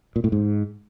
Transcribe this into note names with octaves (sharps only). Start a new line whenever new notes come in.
A#2
A2
G#2